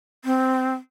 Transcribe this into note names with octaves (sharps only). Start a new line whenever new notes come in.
C4